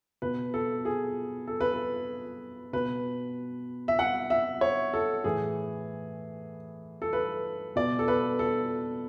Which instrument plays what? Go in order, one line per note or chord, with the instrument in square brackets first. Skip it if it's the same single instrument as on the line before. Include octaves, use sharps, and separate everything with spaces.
[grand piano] B2 B4
A4
G#4
A4
B4
A4
B2 B4
E5
F#5
E5
C#5
A4
A2 E3 G#4
A4
B4
B2 D5
A4
B4
A4